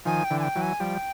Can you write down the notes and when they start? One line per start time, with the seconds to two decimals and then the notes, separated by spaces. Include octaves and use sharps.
0.05 D#3 F3 G#5
0.24 G5
0.31 D3 E3
0.39 G#5
0.43 G5
0.55 E3 F#3
0.62 G#5
0.80 F3 G3 G5